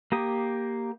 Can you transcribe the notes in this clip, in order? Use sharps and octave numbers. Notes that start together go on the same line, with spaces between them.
A#3 G4 D#6